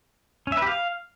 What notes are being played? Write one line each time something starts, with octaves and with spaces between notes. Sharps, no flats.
C#4
E5
B4
G4
F5